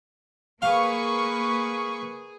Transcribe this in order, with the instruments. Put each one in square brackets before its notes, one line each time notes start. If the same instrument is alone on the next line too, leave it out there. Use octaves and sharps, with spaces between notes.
[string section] A#3 B4 C#6 [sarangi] G#4 [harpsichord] F5